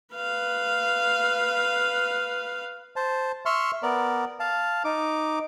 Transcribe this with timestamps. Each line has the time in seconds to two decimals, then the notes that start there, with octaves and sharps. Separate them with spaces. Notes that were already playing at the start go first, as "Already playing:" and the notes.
0.15 B4 F5
2.96 C5 A5
3.46 E5 C6 C#6 F6
3.83 B3 A#4 D5
4.40 F5 A5
4.85 D#4 D6